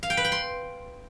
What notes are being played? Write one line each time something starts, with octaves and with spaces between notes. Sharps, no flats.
F5
G5
B4
G5
C6